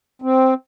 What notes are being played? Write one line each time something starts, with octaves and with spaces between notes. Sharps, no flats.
C4